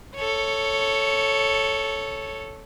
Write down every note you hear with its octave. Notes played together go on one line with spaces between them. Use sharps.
A4 C#5